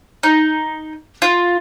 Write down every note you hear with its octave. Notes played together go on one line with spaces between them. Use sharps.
D#4
F4